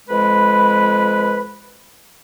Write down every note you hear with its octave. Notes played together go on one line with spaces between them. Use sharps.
F2 G#3 B4